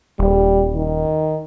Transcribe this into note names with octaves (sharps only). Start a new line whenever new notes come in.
D#1 G3
D#3